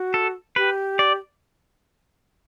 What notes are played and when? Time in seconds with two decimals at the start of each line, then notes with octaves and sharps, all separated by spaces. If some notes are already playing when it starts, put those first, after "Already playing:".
Already playing: F#4
0.14 A4
0.56 G4 B4
0.99 D5